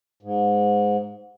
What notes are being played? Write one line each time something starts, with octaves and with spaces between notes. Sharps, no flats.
G#2